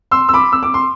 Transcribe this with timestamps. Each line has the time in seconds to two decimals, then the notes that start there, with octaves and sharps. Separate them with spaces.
0.11 C6 E6
0.29 E6
0.33 B5 D6
0.52 E6
0.63 D6
0.74 C6